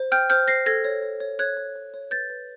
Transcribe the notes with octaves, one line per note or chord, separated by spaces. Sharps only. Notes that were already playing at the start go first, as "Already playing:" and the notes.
Already playing: C5
G5 F6 G6
C5 F6 G6
C5 A#6 C7
A4 G#6 A#6
C#5
C#5
C#5
C#5 F#6 G#6
C#5
C#5
C#5
B4 G6 A6
B4